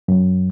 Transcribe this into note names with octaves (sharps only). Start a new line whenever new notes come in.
F#2